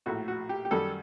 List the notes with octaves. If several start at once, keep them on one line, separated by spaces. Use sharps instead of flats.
A#1 A2 A3 F#4
F#4
G4
G4
F#2 D#3 G3 A4